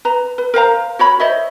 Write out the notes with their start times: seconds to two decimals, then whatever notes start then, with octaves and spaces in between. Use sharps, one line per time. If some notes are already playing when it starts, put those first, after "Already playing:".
0.05 B4 A#5
0.38 B4
0.54 A#4 C5 F5 A#5
0.99 F#4 C#5 B5
1.20 C5 C#5 D#5 E5